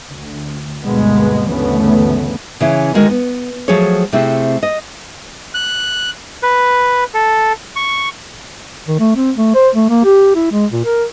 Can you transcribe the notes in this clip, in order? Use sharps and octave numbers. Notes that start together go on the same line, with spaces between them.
D2
D2 G2 B2 G#3 A#3 B3
G1 D2 C#3 E3 A3 B3
C#3 E3 C#4
D3 D#3 G#3 F#4 A#4
B3
F3 F#3 A3 G#4 C#5
C3 A3 C4 E4 G#4
D#5
F#6
B4
A4
C#6
D#3
A3
C4
A3
C5
A3
A#3
G4
E4
G#3
A#2
A#4